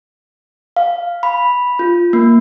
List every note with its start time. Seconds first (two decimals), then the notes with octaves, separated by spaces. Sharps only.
0.76 F5
1.23 B5
1.79 F4
2.13 A#3